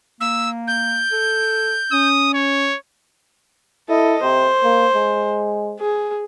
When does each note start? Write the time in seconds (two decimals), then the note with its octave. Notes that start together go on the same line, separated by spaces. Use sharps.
0.21 A#3 E6
0.67 G6
1.12 A4
1.92 C#4 D#6
2.34 C#5
3.89 E4 A4 D#5
4.22 C3 C5
4.64 A#3
4.95 G#3
5.79 G#4